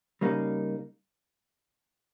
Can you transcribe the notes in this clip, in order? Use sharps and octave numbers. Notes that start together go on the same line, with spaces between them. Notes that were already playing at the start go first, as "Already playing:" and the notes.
C#3 G3 A#3 D#4